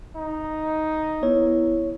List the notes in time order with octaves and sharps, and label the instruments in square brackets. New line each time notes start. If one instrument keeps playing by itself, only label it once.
[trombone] D#4
[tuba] B3 [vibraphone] E4 [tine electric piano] C#5